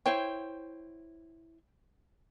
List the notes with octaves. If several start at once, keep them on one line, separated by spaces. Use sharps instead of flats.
E4 C5 C#5 G5